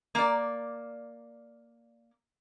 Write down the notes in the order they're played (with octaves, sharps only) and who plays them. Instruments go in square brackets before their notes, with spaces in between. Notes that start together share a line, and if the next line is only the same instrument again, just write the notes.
[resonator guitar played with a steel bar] A#3 D5